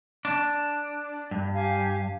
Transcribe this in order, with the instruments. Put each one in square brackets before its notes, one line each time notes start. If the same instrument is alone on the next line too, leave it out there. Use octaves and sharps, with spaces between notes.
[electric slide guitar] D4
G2
[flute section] G4 F5 G#5